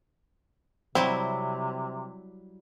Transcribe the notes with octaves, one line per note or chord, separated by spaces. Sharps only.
C3 F#3 G3 C4 E4